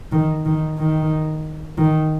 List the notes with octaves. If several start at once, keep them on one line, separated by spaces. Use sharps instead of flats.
D#3
D#3
D#3
D#3